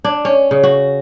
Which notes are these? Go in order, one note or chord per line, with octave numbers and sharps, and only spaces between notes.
D4
C#4
C#3
F#4